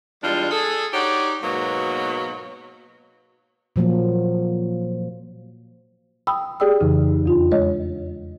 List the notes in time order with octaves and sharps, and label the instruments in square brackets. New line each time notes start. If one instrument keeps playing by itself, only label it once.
[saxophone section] E2 G3 G#3 D4 F4
G#4 A4
D#4 F#4 G4 C#5 D5
G#2 B2 F#3 A#3 B3
[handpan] A#2 F3 F#3 A#3
[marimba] G5 B5 D#6 E6
G4 G#4 D5 G5 D#6 E6
F2 C#3 E3 D#4
E2 F4
G#3 C#5 D#5